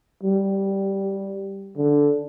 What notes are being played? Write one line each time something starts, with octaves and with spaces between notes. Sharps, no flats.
G3
D3